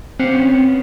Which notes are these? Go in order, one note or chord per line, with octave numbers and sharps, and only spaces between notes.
C4 G4 F5 F#5
B3 C#4